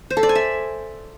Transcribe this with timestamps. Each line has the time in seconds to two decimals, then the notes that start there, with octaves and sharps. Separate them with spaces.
0.10 C5
0.17 A4
0.23 D5
0.29 G#5
0.35 E5